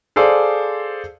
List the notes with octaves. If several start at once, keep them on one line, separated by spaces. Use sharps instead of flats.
G#4 A4 C5 D5 F5